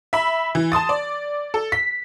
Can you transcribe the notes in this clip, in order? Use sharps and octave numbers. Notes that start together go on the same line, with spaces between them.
E5 B5
E3
A5 C6 D#6 A6
D5
A4
B6